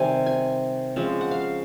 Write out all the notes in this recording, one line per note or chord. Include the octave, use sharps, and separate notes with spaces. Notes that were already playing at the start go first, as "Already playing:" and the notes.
Already playing: C3 D#3 G3 G#5
G#5
C#3 F3 G#3 C4
F#5
F5